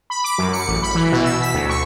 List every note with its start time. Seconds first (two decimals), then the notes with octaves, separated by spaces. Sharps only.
0.10 B5
0.24 D6
0.38 F#2
0.53 C#7
0.68 A1
0.83 B5
0.95 E3
1.12 B2
1.24 E6
1.42 B6
1.54 D2
1.69 C#6